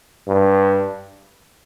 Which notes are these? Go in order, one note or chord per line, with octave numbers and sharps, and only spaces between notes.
G2